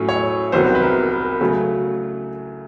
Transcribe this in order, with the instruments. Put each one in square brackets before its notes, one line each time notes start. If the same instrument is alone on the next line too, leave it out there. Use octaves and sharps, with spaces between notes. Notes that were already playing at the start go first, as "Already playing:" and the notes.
Already playing: [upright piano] A2 F#3 A3 C#4
C#5
C2 C3 D#3 F#3 B3 C5
B4
A#4
A#4
C#3 F#3 A3